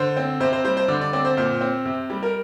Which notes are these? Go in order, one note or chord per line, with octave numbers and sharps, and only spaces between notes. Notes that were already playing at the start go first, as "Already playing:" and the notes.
Already playing: D3 C5
C4
C3 C5
C5
G3 C5
C5
D3 D5
D5
C4 D5
C5
A#2 C5
C4
C3
G3
A#4